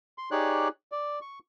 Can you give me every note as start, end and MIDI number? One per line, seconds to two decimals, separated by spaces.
0.18 0.30 84
0.31 0.68 63
0.31 0.68 67
0.31 0.68 68
0.31 0.68 73
0.31 0.68 74
0.31 0.68 90
0.92 1.19 74
1.21 1.39 85